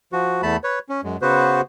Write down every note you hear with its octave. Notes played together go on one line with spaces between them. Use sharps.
F3 F#4
E2 A3 A5 B5
B4 C#5
C#4
F#2 G#3
C#3 B3 F#4 B4 C5